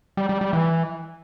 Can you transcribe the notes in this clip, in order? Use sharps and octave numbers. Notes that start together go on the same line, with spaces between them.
G3
G3
G3
E3